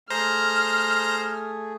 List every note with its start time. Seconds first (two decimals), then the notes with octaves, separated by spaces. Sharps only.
0.10 A3 G#4 C5 A#5 F6 A#6